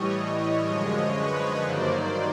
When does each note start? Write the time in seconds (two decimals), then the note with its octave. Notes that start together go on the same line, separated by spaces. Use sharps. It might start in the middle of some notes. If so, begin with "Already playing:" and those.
Already playing: A2 E3 G3 C#5 D#5
0.65 F#2 D3 F3 G#3 C#5 D#5
1.13 B4 C#5
1.61 G2 D#3 F#3 A#3 C5 D5